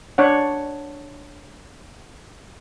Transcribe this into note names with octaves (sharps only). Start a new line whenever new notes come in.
D4 C#5 F#5